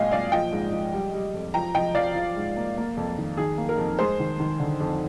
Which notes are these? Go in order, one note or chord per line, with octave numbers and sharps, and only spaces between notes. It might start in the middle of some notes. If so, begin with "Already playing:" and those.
Already playing: A#2 G#3 D#5 F5 G5 G#5
A#2 D5 F5
F3 D#5 G5
G#2
F3
G3
G3
F2
F3 G5 A#5
F3 D#5 G5
F3 D5 F5
F3
G#2
A#3
A#3
F2
D#3
D#3 G#4
A#3
A#4
F2
G#3 G#4 C5
D#3
D#3
D3
F2